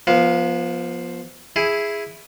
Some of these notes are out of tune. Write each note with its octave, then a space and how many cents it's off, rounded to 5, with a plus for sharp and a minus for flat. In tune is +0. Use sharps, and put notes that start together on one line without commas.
F3 +0 B3 -30 F5 +0
E4 +0 G#4 +0